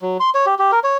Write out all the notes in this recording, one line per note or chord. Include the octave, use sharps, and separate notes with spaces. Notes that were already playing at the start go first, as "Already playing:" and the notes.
F#3
C6
C#5
G4
G4
A#4
C#5